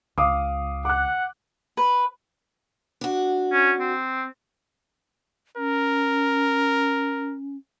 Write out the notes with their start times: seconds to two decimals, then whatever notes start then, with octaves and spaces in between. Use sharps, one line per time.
0.18 C#2 F5 D6 D#6
0.85 F#5 D6 F#6
1.77 B4
3.01 D4 F#4
3.52 C#4
3.80 C4
5.57 C#4 A#4